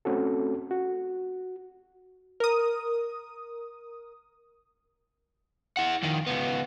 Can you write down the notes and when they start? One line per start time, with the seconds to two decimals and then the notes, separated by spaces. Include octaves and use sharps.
0.05 A3 C4 C#4 F#4 A4
0.71 F#4
2.40 A#4 D#6
5.77 E4 F#5
6.02 F2 D#3
6.27 C#2 B3